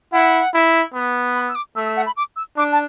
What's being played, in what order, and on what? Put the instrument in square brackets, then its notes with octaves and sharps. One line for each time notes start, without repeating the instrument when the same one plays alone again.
[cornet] E4 [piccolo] F#5
[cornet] E4
B3
[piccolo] B5
E6
D6
[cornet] A3 [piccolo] E6
[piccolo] E6
F#5
B5
D6
E6
[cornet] D4 [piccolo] D6
[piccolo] A5